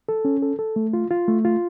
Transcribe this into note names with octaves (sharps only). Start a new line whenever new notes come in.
A4
C#4
A4
A4
A3
F4
F4
A3
F4